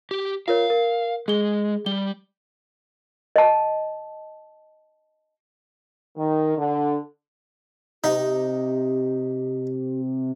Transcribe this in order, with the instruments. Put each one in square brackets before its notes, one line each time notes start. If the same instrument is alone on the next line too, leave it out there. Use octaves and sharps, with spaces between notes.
[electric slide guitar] G4
[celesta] F4 A#4 C#5 [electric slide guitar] F5
[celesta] A#4
[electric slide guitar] G#3 [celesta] G#4 G7
[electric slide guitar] G3 [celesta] G7
[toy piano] D#5 A5
[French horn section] D#3
D3
[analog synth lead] C3 [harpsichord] D#4 [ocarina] G4